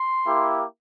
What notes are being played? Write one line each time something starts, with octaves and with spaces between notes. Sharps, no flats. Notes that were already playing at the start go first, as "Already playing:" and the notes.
Already playing: C6
A#3 E4 G4